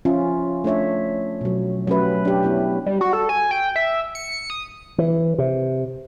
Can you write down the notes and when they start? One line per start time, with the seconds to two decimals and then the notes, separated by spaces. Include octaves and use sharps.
0.05 F3 C#4 F4 E5
0.64 A3 D4 C#5 E5
1.41 B2 F#3
1.87 F#3 A3 C#4 G4 B4 E5
2.25 D4 G4
2.43 B3 E4 C#5
2.86 G3
3.01 F#4
3.13 A4
3.29 G#5
3.51 G5
3.76 E5
4.15 C#7
4.50 D#6
4.98 E3
5.38 C3